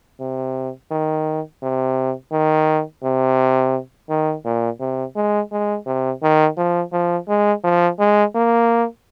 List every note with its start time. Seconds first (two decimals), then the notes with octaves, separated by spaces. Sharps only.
0.20 C3
0.91 D#3
1.62 C3
2.32 D#3
3.03 C3
4.09 D#3
4.45 A#2
4.80 C3
5.16 G#3
5.52 G#3
5.86 C3
6.23 D#3
6.57 F3
6.92 F3
7.28 G#3
7.64 F3
7.99 G#3
8.35 A#3